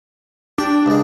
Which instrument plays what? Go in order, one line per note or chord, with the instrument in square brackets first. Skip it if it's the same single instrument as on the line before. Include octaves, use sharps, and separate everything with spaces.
[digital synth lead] D4 [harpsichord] G4
[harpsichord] C#2 G#3